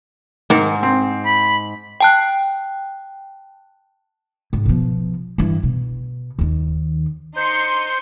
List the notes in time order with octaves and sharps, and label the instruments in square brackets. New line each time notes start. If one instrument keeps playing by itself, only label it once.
[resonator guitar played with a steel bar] G#2 [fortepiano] D#3
[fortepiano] C4
[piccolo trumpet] B5
[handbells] G5 A5 F#6
[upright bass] G#2
B2 F3
G2 E3
B2
D#2 D#3
[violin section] D#4 C6 C#7 [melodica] C5